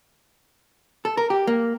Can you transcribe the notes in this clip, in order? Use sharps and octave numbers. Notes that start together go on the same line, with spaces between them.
A4
A#4
G4
A#3